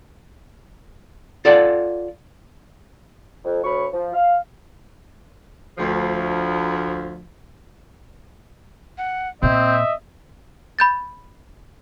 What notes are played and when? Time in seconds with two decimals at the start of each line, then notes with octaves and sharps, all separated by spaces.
1.45 F4 A4 D5 F5 F#5
3.44 F2
3.64 D2 C#5 B5 C#6
3.93 F3
4.14 F5
5.79 D2 F3
8.98 F#5
9.43 A#2 C4 D#5 E5 G6
10.79 B5 G6 A6